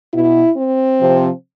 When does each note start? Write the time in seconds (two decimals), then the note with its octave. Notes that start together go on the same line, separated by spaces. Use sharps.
0.12 B2 E4
0.55 C4
0.98 C3 F3